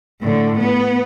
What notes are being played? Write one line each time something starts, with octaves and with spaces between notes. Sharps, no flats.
A2 D3
B3